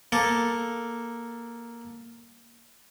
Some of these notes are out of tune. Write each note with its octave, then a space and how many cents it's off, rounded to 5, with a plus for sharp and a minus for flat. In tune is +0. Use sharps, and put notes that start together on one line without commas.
A#3 +5 A4 +0